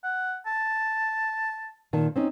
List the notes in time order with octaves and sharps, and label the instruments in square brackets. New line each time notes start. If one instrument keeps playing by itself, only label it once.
[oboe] F#5
A5
[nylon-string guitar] A#2 D#3 A5
C4 C#4 D#4